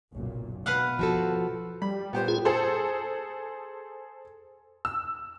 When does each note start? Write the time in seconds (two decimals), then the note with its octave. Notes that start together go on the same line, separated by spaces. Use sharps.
0.12 F#1 B1 A#2
0.66 B2 B4 F5 F#5
0.99 F3 F#4 A4
1.82 G3 B5
2.13 A#2 B3 G4 C5
2.28 F4 G#4
2.45 G#4 A4 C5
4.85 E6